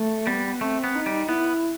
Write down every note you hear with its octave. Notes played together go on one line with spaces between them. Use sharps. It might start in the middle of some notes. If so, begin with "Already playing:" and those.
Already playing: A3
G3 B3
A3 C4
B3
D#4
G3
B3 E4